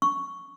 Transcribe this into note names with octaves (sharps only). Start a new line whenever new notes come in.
C#6